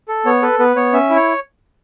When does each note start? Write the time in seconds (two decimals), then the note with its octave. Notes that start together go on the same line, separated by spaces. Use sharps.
0.08 A4
0.25 B3 C#5
0.42 A4 B4
0.59 B3 B4
0.76 B3 C#5
0.93 C#4 E5
1.10 E4
1.16 C#5